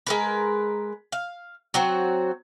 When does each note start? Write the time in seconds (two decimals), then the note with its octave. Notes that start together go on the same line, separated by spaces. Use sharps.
0.07 G#3 A#4 B4
1.12 F5
1.74 F#3 C4 F#4